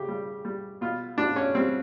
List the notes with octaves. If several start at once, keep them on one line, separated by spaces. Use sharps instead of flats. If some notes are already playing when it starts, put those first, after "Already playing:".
Already playing: C#3 G4
G3
G3
B2 F4
B2 D4
C#4
G3 C4